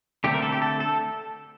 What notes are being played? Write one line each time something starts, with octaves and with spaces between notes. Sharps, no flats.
D3 A3 C4 G4
A#4
A4
G4
A4
A4